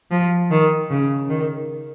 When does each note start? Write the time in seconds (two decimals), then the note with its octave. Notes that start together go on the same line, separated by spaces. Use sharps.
0.11 F3
0.51 D#3
0.90 C#3
1.30 D#3